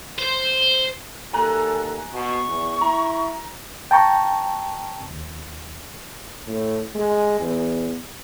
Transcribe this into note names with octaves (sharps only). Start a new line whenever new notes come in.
C5
D#2 A4 G#5 A#5 F#6
B2 C#6
E2
E4 A#5
G5 A5 A#5 C#6
D#2
A2
G#3
E2